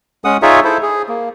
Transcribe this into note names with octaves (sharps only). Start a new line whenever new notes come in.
G#3 C#4 F#5 D#6
D#4 F4 G#4 C#5 E5
E4 A4 C5
G#4
A#3